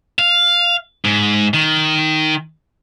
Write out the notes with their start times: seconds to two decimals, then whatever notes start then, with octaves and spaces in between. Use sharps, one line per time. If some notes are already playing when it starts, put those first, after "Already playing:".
0.19 F5
1.05 G#2
1.54 D#3